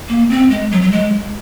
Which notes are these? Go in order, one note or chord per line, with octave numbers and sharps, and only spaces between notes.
A#3
C4
G#3
F#3
F#3
G#3